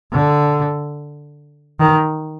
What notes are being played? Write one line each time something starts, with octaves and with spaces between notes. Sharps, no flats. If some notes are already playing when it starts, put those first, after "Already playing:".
D3
D#3